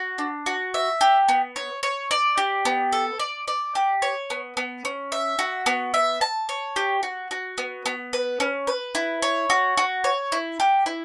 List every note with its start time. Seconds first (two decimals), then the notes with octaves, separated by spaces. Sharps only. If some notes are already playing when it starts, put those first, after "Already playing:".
Already playing: F#4
0.18 D4
0.46 F#4
0.74 E5
1.01 G4
1.28 B3
1.56 C#5
1.83 C#5
2.11 D5
2.38 G4
2.65 B3
2.92 A4
3.20 D5
3.48 D5
3.75 G4
4.02 C#5
4.30 B3
4.57 B3
4.85 C#4
5.12 E5
5.39 F#4
5.66 B3
5.94 E5
6.21 A5
6.49 C#5
6.76 G4
7.03 F#4
7.31 F#4
7.58 B3
7.86 B3
8.13 B4
8.40 C#4
8.67 B4
8.95 E4
9.22 C#5
9.50 F#4
9.77 F#4
10.04 C#5
10.32 E4
10.60 G4
10.86 E4